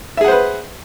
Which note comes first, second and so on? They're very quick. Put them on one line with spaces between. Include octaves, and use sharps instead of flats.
E5 G#4 F#5 C5 B4